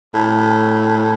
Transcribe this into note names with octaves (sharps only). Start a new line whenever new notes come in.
A2